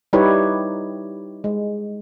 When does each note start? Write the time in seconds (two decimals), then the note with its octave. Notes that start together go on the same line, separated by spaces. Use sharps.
0.13 G3 D#4 E4 G4 B4 C#5
1.44 G#3